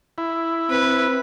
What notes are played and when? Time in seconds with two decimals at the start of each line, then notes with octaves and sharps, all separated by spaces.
0.18 E4
0.70 C4 B4